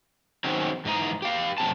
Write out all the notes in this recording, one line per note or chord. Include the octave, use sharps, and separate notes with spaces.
D#3 F#3 C4 C#4
G#2 E3 D#5 A#5
G4 F5
F#2 C3 A5